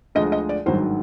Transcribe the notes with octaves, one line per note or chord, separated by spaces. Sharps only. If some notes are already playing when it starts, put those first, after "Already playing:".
D2 D3 F3 G#3 D#5
D#5
D5
G#1 G2 D#3 F#3 C5